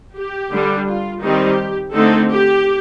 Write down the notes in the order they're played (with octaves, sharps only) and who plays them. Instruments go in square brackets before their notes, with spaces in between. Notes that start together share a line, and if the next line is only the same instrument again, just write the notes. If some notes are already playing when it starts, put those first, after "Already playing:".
[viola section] G4
D3 G3 D4
F4
D#3 G3 C4 D#4 G4
D3 A3 C4 D#4 A4
G4